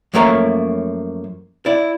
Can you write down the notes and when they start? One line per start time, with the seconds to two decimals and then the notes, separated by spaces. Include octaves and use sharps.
0.14 F#2 F3 A3 A#3 C#5 A#5
1.66 E4 D5